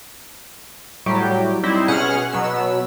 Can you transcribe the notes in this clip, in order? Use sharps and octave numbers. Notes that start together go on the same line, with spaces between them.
A2 F#3 G3 G4
G3 C4 D#4 E4 C5
B2 C#4 G#4 F#5 F6
B2 F#3 B3 E6